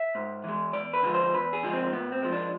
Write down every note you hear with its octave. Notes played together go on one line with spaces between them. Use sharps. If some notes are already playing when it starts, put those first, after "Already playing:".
Already playing: E5
G#2
E3 G#3
E2 D5
B4
D3 F3 G#3
C5
E2 B4
G#4
D3 F3 G#3
C4
A2 B3
C4
F3 G#3
D4